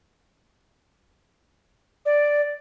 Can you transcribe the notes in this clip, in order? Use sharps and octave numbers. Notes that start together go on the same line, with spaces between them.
D5